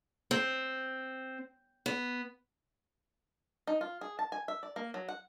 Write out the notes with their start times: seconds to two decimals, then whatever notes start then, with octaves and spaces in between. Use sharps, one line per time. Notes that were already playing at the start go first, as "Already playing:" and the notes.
0.31 C4
1.86 B3
3.67 D#4
3.81 F4
4.01 G#4
4.19 A5
4.32 G#5
4.48 E5
4.63 D5
4.76 A#3
4.94 F#3
5.08 F#5